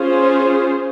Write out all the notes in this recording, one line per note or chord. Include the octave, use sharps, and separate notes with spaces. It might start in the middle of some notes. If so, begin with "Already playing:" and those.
Already playing: C#4 F4 G#4 C5